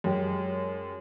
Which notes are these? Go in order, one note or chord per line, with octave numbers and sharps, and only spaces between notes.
F#2 G#3 G4